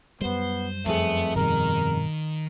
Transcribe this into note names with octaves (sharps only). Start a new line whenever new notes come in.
F#2 G3 B3 C5
F2 A3 B3 C4 G#4
G2 B2 D#3 G3 A#4